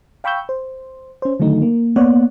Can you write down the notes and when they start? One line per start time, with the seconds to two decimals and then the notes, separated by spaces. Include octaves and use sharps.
0.24 F5 G5 B5 C#6 E6 G6
0.49 C5
1.22 C#4 C5
1.40 D3 D#3 F#3 A3 D#4
1.62 A#3
1.96 A#3 B3 C#5 D5 F#5